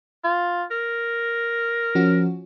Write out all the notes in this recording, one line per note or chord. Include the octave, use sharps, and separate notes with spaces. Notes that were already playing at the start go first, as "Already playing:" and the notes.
F4
A#4
F3 C#4 F#4